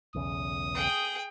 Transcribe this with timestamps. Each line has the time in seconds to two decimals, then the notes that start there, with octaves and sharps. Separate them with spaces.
0.15 B1 E2 C#3 D#6
0.74 G#4 G5